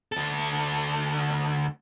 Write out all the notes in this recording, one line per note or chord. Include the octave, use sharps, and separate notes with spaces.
D2 A4